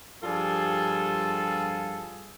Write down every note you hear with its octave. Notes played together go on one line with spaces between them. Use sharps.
G2 F3 G3 F4 G#4 A4